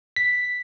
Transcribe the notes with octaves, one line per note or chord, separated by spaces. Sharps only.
B6